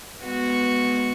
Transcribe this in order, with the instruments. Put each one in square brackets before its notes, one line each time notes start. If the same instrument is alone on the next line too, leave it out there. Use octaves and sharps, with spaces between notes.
[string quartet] G#3 B3 F#4